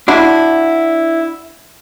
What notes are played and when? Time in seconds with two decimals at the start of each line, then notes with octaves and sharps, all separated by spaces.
0.08 D4 E4 F#4